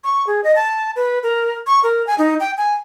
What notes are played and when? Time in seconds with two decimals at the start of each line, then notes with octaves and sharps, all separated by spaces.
0.04 C#6
0.27 G#4
0.44 D#5
0.56 A5
0.96 B4
1.23 A#4
1.67 C#6
1.83 A#4
2.07 G#5
2.18 D#4
2.40 G5
2.58 G#5